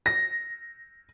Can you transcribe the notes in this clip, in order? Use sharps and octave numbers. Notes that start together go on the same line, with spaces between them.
A#6